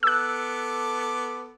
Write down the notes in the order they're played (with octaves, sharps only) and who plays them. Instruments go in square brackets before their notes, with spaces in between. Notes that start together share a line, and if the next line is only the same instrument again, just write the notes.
[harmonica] B3 A4 D6 [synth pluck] E6 F#6